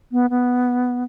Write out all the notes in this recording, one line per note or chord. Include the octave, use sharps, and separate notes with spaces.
B3
B3